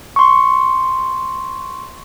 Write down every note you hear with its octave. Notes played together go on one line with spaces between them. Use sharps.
C6 C#6